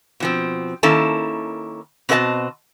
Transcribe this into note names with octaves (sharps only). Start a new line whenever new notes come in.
B2 F3 C4
D#3 A#3 C#4 E4 A4 A5
B2 C4 F#4 A#4 D#5 A5